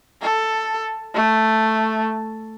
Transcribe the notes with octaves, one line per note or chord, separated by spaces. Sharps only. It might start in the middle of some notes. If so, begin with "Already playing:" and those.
A4
A3